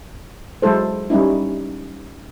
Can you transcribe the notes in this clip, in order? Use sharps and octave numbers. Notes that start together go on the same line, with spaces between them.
F#3 G#3 E4 A4 C5
G3 C#4 D#4 E4